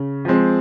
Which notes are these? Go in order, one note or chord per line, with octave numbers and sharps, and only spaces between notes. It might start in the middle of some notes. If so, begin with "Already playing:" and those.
Already playing: C#3
F3 G#3 C4